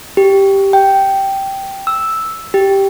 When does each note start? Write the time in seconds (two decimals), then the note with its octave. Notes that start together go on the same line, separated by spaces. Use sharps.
0.17 G4
0.73 G5
1.87 E6
2.54 G4